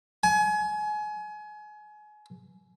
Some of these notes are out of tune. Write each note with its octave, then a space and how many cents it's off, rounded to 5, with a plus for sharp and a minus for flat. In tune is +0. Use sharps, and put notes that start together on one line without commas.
G#5 +30